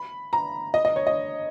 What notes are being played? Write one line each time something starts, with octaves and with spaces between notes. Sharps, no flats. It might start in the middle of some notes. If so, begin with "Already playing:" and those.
Already playing: B5
A#5
D#5
D#5
C#5
D#5